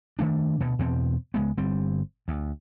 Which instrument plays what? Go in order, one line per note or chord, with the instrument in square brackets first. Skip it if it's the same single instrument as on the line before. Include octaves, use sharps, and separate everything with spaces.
[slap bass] D#3 A3 D4
D2 B2
E2 B2 C4
C#2 G#3 B3
G1 G3 C4
D2